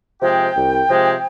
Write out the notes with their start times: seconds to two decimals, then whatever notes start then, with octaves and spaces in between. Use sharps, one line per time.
0.22 C3 F3 G#3 G5
0.55 C2
0.89 C3 F3 G#3